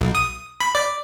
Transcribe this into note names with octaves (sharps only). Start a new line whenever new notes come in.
B1
D#6
B5
D5